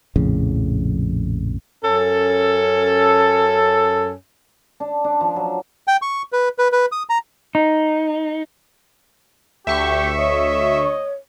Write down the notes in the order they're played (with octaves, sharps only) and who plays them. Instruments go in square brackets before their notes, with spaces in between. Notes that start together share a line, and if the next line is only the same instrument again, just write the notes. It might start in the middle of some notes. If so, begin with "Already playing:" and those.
[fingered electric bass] A#1 F2 A2 C#3
[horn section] F#2 C#4 A4
[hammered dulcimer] D4
D4
F3
F#3
[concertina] G5
C#6
B4
B4
B4
D#6
A#5
[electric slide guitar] D#4
[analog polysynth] D2 C#6 [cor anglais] G4 [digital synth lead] E5
[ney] C#5 [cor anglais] D#5